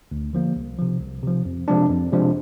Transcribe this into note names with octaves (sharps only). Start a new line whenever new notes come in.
D2
D3 F3 A#3
C2
C3 F3
C2
C3 F3
F2
C3 F3 G#3 D4
F2
C3 F3 G#3 D4